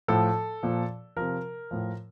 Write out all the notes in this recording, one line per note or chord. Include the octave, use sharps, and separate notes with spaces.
A2 F3 A4
A#2 F3
C3 F3 A#4
A2 F3